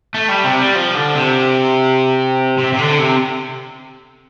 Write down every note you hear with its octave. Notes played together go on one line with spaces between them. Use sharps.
A3
G3
C3
G3
F3
D3
C3
C3
C3
D3
C3